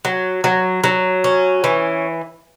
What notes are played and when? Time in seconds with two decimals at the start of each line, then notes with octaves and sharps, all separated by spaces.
0.05 F#3
0.44 F#3
0.84 F#3
1.24 C#4
1.64 E3